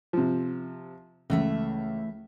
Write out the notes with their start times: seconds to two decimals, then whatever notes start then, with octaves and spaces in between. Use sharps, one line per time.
0.13 C3 F3
1.30 C#2 E3 A3 E5